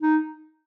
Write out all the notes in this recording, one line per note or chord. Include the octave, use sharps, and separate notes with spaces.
D#4